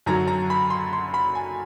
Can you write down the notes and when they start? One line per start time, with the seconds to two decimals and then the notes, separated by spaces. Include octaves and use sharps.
0.06 F#2 D3 F#3 A#5
0.28 A#5
0.50 B5
0.70 C6
0.93 C6
1.14 B5
1.35 G#5